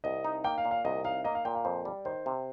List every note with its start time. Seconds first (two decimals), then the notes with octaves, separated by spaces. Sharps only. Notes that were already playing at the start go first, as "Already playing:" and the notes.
0.04 C2 D#5
0.24 D#4
0.44 A#3 G5
0.58 F5
0.65 A#2
0.71 F5
0.85 C2 D#5
1.04 D#4 F5
1.24 A#3 D#5
1.35 F5
1.45 A#2 G5
1.55 F5
1.65 F2 C5
1.85 G3
2.05 D#3 C5
2.26 C3